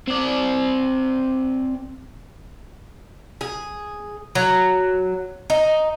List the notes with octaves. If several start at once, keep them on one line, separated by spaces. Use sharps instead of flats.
C4 D5
G#4
F#3
D#4